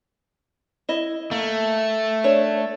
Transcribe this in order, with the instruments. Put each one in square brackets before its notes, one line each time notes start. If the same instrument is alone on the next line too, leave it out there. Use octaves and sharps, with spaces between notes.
[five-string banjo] E4 D#5
[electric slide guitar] A3 [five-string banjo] A#3
[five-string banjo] D4 C#5